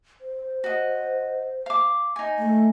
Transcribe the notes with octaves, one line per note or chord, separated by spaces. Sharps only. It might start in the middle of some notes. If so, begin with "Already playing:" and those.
C5
F#4 D#5
F5 D6
D#4 G#5
A3